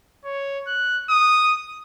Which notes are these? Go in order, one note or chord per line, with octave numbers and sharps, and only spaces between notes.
C#5
F#6
D#6